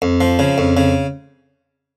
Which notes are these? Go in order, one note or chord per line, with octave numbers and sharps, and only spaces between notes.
F2
F3
C#3
F2
C#3